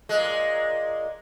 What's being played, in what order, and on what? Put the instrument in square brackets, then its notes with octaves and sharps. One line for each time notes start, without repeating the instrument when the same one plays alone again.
[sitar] A#2 G#3